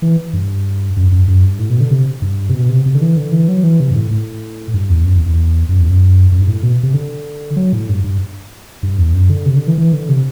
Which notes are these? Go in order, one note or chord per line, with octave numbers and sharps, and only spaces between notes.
E3
G2
F#2
F#2
F#2
G2
A2
B2
D3
C3
G2
C3
B2
C3
C3
D3
E3
D3
E3
F#3
E3
C3
G2
A2
A2
G2
E2
F#2
E2
E2
F#2
E2
F#2
F#2
G2
A2
B2
C3
D3
F#3
A2
G2
G2
G2
E2
F#2
D3
C3
D3
E3
E3
D3
C3